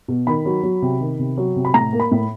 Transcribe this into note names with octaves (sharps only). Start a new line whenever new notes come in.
B2
D#3 B5
F#3
F#3
C3
D#3
C3
F#3
C3
B5
A2 A#5
A#3
B5
A2